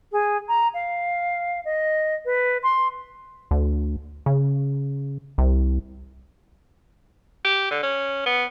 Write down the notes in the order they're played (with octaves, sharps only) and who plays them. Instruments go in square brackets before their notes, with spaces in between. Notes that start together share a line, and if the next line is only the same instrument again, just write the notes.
[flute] G#4
A#5
F5
D#5
B4
C6
[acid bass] D2
C#3
C2
[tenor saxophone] G4
D3
C#4
B3